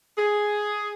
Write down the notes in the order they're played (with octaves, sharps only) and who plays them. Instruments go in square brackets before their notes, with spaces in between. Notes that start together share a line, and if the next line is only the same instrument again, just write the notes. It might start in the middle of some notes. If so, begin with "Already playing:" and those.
[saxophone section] G#4